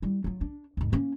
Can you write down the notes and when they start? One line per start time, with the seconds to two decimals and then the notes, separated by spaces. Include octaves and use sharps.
0.02 G3 E4
0.24 F#3 F4
0.41 D4
0.77 D#2 G#2
0.92 A#3 C#4